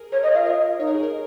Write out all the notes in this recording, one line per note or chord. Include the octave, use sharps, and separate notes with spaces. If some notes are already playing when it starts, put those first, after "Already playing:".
Already playing: G#4 A#4
A#4 C#5
A#4 D#5
F4 F5
A#4 D#5
D#4 C#5
A#4
G#4
A#4